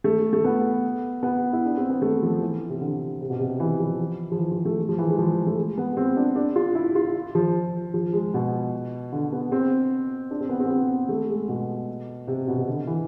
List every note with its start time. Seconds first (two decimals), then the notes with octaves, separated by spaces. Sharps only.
0.04 A3
0.33 A3
0.44 B3
1.23 B3
1.53 E4
1.65 D4
1.77 C4
1.90 B3
2.02 A3
2.22 F3
2.42 E3
2.69 C3
2.81 D3
3.21 C3
3.30 B2
3.40 C3
3.60 E3
3.80 F3
4.31 F3
4.39 E3
4.51 F3
4.65 A3
4.89 F3
4.98 E3
5.10 G#3
5.18 F3
5.47 A3
5.57 G#3
5.78 B3
5.97 C4
6.17 D4
6.36 D4
6.56 F4
6.75 E4
6.95 F4
7.35 F3
7.94 F3
8.13 G#3
8.34 B2
9.12 D3
9.32 B3
9.52 C4
10.31 D4
10.41 C4
10.49 B3
10.60 C4
10.65 B3
10.70 C4
11.09 A3
11.29 G#3
11.49 B2
12.27 C3
12.48 B2
12.57 C3
12.68 D3
12.87 E3